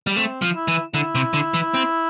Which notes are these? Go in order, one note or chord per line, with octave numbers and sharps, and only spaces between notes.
G3
A3 C4
F3
E4
E3
D3 E4
C3
D3
E3
C4